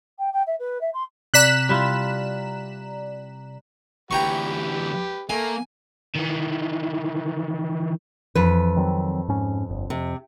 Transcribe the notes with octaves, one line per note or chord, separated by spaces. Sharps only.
G5
G5
E5
B4
E5
C6
C3 D5 A#5 F#6 B6 E7
G3 E4 F4
D2 E3 G4 B4 G5 A#5 C#6
A3 A#3 G#5
D#3 E3
F2 E3 B4
D#3 F#3 C4
G#2 C#4
G1
F2 C3